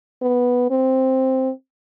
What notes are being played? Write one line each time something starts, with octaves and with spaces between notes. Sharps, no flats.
B3
C4